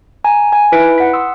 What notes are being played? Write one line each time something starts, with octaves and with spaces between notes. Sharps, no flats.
G#5 A#5
G#5
D#4 E4 B4 B6 D7
F#5 B6
C6 D#6 E6